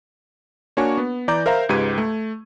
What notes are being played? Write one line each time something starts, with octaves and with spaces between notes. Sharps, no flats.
A#3 D4 F#4 C#5 G#5 C#6
B3
E3 D5 A#5 D6 G6
A#4 C5 E5 F5 A#5
C#2 G#2 G4 B4 G#6 D#7
A3